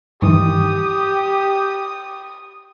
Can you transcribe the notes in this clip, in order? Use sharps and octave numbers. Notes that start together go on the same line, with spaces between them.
G2 D#3 E3 G4 D#6